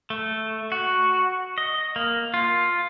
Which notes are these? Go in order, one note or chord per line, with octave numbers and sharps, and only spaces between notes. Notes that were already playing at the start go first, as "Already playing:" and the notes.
A3
F#4
D#5
A#3
F4